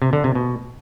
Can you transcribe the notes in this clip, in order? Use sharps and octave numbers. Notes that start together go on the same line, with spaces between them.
C3
D3
C3
B2